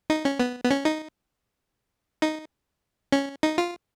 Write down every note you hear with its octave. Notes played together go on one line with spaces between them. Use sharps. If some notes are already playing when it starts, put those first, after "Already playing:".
D#4
C#4
B3
B3
C#4
D#4
D#4
C#4
D#4
F4